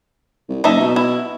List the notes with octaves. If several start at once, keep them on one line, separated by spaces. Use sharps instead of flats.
C2
F#1 D#4 A4 E5
B2
E4